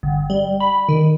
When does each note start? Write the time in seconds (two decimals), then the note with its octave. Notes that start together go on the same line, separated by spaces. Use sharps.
0.03 G1
0.30 G3
0.60 B5
0.89 D#3